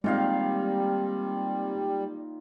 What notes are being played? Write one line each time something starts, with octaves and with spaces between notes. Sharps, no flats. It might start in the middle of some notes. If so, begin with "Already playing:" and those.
A#2 D#3 G3 G#3 C4 F5